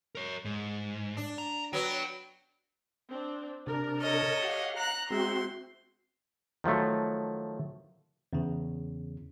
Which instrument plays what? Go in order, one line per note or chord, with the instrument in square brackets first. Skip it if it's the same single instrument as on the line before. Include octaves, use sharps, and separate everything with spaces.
[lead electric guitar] A#4 C#5
G#2
[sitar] D4
[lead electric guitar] A#5
[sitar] F#3 B3 [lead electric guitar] G5
[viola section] C4 D4
[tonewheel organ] C3 D4 [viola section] A#4
[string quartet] A4 C#5 D#5
[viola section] G4 [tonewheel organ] F5 F#5
[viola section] A#5 [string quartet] F#6
[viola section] G#3 E5 [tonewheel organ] C4 F#4 [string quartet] C6
[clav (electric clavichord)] D#3 F3 F#3 A3
[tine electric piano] E2 C#3